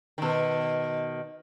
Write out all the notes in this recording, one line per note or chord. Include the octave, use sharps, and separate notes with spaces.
B2 D#3